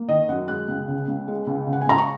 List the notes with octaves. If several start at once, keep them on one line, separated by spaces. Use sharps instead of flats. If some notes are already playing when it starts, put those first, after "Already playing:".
Already playing: A#3
D#3 D#5
F#2 F#5
G#3 F#6
C#2
C#3
C#2
G#3
C#2
C#3
F#5
G#5
C#2 A#5
C#6